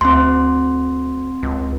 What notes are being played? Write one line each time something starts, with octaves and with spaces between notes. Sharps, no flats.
D2 C4 C6
C#2